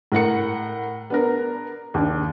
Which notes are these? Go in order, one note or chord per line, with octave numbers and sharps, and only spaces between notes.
A2 A#4 F#5 C#7
B3 D4 A#4
D#2 D4